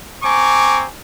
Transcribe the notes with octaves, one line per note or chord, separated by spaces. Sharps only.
C4 G#5 A#5 C#6 D6